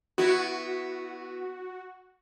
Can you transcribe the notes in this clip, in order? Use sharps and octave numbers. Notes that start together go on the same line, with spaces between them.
B3 E4 F#4